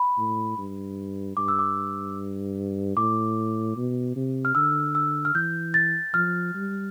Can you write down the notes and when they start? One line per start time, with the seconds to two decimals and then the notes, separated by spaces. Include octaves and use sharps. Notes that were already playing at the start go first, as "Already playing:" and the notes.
Already playing: B5
0.18 A2
0.58 G2
1.37 G2 D6
1.48 E6
1.59 D6
2.97 A2 D6
3.76 B2
4.16 C3
4.45 F6
4.55 D3 E6
4.95 E6
5.25 F6
5.35 E3 G6
5.74 A6
6.14 F3 F6
6.55 G3